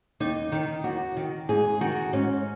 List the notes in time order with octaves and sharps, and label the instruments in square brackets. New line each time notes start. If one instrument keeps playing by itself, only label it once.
[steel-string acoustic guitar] D#2 D#4
D#3
D#2 F#4
D#3
G#2 G#4
D#3 F#4
G#2 C#4